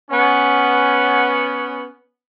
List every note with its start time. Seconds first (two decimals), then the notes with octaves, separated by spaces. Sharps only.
0.11 B3 C#4